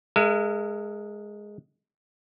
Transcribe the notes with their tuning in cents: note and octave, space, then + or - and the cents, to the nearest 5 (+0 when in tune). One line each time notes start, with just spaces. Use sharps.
G#3 +0 A#4 -40 E5 +45